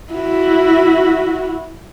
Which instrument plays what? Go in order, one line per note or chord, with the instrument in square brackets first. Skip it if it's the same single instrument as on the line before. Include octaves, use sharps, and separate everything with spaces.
[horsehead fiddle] E4 F#4